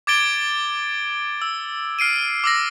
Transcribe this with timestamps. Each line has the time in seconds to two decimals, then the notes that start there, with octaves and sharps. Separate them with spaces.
0.07 D6 G#6 A6 D7 G7
1.42 E6
1.99 F6 C7 D7 D#7
2.44 D6 E6 A#6